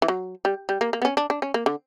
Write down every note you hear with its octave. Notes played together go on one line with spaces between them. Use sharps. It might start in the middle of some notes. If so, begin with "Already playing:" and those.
E3
F#3
G3
G3
A#3
A#3
B3
C#4
D4
D4
C#4
A#3
D3